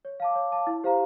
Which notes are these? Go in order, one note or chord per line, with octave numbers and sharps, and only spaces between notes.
C#5
F5 A5 D6
C#5
F5 A5 D6
E4
G4 C5 F5 A#5